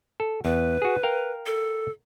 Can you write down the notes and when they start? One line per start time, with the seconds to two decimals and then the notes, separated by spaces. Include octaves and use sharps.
0.20 A4
0.45 E2 B4
0.82 F#4 G#4
1.03 A#4 F5 G5
1.46 A4